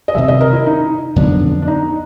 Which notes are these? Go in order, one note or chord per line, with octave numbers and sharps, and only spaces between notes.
D#5
C3 D#3 G3 E5
D#5
A#4
E4
D#4
F2 D3 F#3 B3 D4
D4
D#4